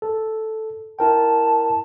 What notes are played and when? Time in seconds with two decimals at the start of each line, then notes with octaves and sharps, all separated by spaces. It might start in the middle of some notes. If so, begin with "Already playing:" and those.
0.02 A4
0.99 E4 A#4 G5 A5